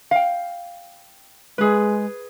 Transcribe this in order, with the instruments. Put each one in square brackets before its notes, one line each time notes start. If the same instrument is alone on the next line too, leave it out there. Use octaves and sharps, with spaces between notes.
[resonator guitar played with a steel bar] F5 G5
[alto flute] G#3 [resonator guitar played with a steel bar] G#4 B4